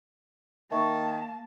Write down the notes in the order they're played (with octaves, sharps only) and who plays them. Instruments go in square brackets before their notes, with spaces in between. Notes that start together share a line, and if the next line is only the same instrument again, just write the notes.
[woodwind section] D#3 [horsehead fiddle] A#3 [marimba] E5 C#6 [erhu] A5